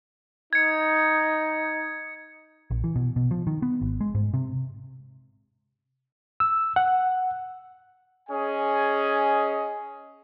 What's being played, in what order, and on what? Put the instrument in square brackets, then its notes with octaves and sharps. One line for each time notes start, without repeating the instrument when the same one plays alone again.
[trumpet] D#4 [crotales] G#6 C#7
[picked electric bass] A#1
E3
B2
B2
F3
D#3
B3
G#1
G#3
G#2
C3
[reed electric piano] E6
F#5
[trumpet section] C#4 G#4 D#5 G#5